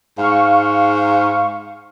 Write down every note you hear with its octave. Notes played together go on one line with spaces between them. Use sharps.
G#2 F5 C#6